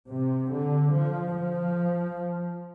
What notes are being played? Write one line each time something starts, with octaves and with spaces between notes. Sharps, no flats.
C3
D3
F3
F3